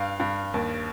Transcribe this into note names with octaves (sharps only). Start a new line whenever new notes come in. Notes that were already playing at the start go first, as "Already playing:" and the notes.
Already playing: G2 F5
G2
D#2